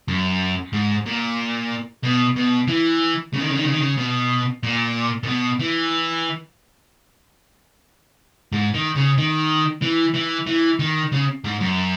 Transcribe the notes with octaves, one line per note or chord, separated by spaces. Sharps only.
F#2
G#2
A#2
B2
B2
E3
C#3
D#3
C#3
D#3
C#3
D#3
C#3
B2
A#2
A#2
B2
E3
G#2
D#3
C#3
D#3
E3
E3
E3
D#3
C#3
G#2
F#2